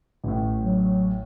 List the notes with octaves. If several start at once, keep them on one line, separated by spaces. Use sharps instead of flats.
A1 A2
F#3